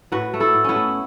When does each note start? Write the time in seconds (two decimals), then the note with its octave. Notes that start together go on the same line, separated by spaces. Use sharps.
0.12 A2 F#4 B4
0.34 A3
0.40 E4 A4
0.55 A2
0.64 B3 C#4 E4
0.76 A3